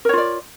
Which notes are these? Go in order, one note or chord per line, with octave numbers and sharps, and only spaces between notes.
F4 A#4 C#5 D5